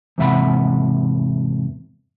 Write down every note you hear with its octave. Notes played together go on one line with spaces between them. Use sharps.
E2 G#2 C3 E5 F#5 B5